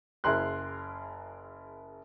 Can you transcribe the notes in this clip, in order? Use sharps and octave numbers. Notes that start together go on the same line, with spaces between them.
F#1 E4 G#4 A#4 C6 F#6